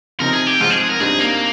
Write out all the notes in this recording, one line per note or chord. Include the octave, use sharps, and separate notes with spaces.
C3 F3 C4 D#4 A#4
G#4
G4
G#2 F3 G#3 C4 F4
G#4
G#4
A#4
G2 G3 C4 D#4 G#4
A#3